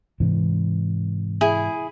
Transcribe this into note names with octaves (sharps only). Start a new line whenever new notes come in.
G#2 C3 E3
E4 G#4